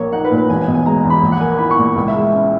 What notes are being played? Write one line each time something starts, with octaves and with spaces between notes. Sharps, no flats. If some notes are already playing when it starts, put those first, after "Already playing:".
Already playing: A#1 A#3 C#5
D#4 F#5
B4
A#2
B4
E1 G#5
G#5
B2
G#5
G#3 A#5
E2
B5
A#1
F#5
A#3 G#5
E4 B5
C#6
A#2
C#2
E5
G#3
C#4